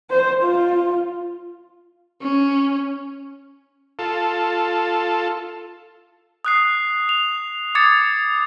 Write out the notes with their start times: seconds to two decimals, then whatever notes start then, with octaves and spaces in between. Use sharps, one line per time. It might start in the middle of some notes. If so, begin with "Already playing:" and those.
0.10 C5
0.42 F4
2.22 C#4
3.99 F4 A4
6.45 D#6 F#6 C7
7.09 F7
7.75 D6 D#6 G#6 A6 C#7